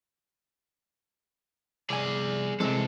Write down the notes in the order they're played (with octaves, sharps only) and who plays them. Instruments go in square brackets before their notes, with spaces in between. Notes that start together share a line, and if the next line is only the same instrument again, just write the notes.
[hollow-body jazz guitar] C2 G#5 [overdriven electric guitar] G#4 D5
[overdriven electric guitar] C3 A4 [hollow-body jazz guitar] E3 G#3 C4